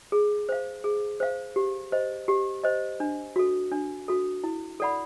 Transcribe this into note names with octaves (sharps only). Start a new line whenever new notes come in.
G#4
C5 F5
G#4
C5 F5
G4
C5 D#5
G4
C5 D#5
D4
F#4 A4
D4
F#4 A4
E4
A4 D5 F#5 B5